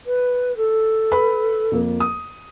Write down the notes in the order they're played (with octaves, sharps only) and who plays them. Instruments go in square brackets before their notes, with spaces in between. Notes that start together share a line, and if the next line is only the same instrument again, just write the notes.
[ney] B4
A4
[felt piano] B4 B5
F2 A#3
D#6